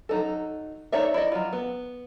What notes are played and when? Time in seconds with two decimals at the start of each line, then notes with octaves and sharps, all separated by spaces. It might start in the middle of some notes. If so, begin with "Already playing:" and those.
0.09 F#3 D#4 A4
0.92 D#4 A4 C#5 D5 E5
1.14 E4 D5 D#5
1.32 F#3 F4
1.53 B3